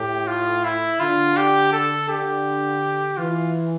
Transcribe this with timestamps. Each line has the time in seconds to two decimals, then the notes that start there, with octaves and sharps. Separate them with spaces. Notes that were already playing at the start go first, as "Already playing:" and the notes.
Already playing: A2 G4
0.27 F4
0.65 E4
1.00 D3 F4
1.37 G4
1.72 A4
2.09 D3 G4
3.17 E3 F4